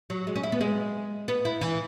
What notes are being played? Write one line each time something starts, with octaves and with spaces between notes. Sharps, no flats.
F#3
G#3
C#4
E4
B3
G#3
B3
E4
E3